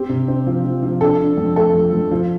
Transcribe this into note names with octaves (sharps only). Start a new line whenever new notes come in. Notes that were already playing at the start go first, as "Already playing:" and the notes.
Already playing: C4 G4
C3
C4
F3
F3
F3
D4 A4
D4
F2
A3 A4
F2
F2
F3